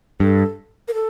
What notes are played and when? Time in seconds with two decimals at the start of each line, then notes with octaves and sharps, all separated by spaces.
0.20 G2 A4
0.88 A#4
0.94 A4